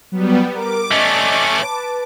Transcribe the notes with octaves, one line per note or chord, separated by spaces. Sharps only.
F#3 G3 B3
A#4 D6
A3 C#4 D5 D#5
B4 A5